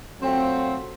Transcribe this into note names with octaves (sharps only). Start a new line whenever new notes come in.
F#3 A3 C4 F4